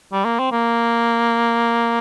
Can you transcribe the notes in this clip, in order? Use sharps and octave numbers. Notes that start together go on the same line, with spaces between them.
G3
A#3
C4
A#3